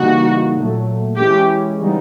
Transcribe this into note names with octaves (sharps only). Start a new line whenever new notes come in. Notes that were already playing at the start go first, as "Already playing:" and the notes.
Already playing: C#3 E3 G3 A#3 D#4 F#4
A#2 F#3 A3
E3 G#3 C#4 E4 G4
C#3 E3 G3 B3 D#4